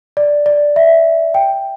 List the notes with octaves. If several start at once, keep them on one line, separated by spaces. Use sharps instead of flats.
D5
D5
E5
G5